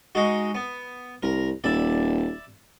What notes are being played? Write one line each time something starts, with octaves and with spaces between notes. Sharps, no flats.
G#3 D#4 F#4
B3
C2 A#4
D#1 D5 E5 B5